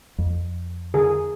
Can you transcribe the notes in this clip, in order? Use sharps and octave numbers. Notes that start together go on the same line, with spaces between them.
F2
D3 G#4 A#4